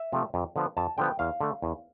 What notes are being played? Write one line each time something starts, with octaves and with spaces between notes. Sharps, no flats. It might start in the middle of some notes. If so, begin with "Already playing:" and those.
Already playing: E5
C3 F3 A3
F2
D3 F3 B3
F2 A5
D3 F3 B3 G5
E2 F5
D3 A3
E2